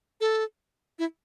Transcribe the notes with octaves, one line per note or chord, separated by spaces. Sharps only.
A4
E4